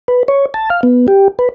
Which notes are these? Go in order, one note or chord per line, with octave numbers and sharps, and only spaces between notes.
B4
C#5
A5
F5
B3
G4
B4